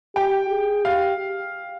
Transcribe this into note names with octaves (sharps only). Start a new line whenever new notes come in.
G4 G5
G#4
G4 F5